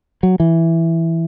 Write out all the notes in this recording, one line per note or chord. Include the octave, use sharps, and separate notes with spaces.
F#3
E3